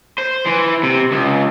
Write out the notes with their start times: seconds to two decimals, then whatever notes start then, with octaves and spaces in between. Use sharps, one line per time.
0.19 C5
0.47 E3
0.83 C3
1.11 C#2